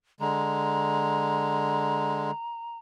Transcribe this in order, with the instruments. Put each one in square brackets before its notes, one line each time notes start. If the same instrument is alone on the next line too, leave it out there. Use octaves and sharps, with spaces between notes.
[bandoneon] D3 G#3 [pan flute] A#5